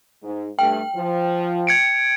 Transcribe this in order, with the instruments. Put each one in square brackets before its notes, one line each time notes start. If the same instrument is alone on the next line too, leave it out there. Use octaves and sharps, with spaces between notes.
[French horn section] G#2
[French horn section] G2 A3 [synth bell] G5
[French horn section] F3
[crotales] G#6 C#7 D7